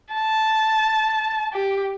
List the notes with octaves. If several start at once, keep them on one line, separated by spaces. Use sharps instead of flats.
A5
G4